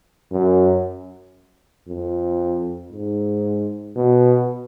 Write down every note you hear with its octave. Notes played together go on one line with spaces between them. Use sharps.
F#2
F2
G#2
B2